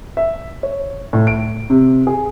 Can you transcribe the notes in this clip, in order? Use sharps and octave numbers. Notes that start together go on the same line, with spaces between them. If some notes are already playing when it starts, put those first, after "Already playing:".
E5
C#5
A2
D7
C3
G#4